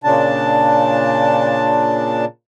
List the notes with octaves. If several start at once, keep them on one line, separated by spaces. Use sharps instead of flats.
A#2 C#3 D4 A5